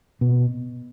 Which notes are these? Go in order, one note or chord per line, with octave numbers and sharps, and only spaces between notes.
B2